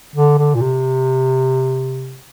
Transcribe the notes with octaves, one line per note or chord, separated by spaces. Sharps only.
D3
D3
A#2
C3